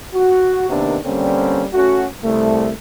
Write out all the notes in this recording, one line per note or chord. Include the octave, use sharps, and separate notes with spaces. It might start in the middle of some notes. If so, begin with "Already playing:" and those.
F#4
C3 D#3 A#3 B3 D4
D3 G3 A#3 C4 C#4
A3 C#4 F#4
C2 A3